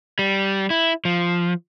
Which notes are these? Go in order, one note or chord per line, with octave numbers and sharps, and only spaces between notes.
G3
E4
F3